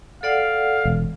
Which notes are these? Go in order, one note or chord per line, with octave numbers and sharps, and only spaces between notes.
A4 D5 F5 F#5
E1